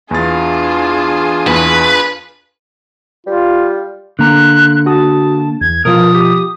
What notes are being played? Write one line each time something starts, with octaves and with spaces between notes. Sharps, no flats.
E2 D4 F4 G#4 A6
E2 B4
G3 F4
D3 A#3 A#5 F#6
F#4 A5 D#6
E2 G#6
B2 F3 F4 A#4 D#6
G4